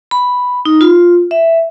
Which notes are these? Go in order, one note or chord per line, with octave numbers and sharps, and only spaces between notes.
B5
D#4
F4
E5